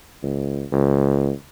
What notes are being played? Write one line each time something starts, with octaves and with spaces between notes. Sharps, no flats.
C#2
C#2